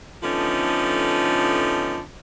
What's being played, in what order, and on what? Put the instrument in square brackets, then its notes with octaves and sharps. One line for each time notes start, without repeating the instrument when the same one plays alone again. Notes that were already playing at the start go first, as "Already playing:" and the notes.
[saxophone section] D3 F3 A3 B3 C#4 D#4